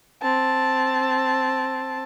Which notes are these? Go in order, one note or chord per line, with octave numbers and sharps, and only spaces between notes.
C4 A5